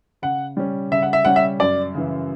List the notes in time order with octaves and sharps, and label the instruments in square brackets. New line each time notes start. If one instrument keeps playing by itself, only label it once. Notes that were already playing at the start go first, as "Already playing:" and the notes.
[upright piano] C#3 [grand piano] F#5
[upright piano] G3 C#4
[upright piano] C#3 [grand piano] E5
[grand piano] F#5
E5
[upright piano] G3 C#4 [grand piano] F#5
[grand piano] E5
[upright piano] F#2 [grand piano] D5
[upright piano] C#3 E3